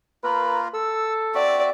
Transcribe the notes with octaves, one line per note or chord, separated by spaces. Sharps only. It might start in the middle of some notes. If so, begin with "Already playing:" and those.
A#3 F4 A#4 B4
A4 E6
C4 F#4 D5 E5